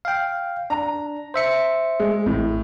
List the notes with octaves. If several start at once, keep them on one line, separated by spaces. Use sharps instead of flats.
F5 G5
D4 A#5
C5 E5 C#7
G#3
A1 A2